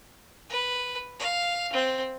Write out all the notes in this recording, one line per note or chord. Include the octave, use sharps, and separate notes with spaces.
B4
F5
C4